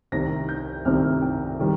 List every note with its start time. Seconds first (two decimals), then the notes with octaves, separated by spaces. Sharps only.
0.12 C2 C3 D#3 A#6
0.49 G6
0.85 C2 C3 D#3 F6
1.22 G5
1.60 D#3 G3